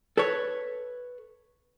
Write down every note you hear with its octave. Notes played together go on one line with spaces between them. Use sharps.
A4 B4 C#5